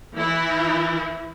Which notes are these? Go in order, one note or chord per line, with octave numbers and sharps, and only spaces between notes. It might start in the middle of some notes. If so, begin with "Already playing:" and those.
E3 E4